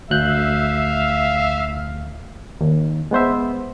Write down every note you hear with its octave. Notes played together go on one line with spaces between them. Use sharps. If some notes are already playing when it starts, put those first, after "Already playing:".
D2 E5 F5 F#6 G6
D#2
G#3 B3 C5 E5